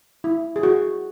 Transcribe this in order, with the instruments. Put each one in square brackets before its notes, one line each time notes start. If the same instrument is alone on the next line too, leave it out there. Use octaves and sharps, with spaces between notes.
[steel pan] E4
G#4
F#4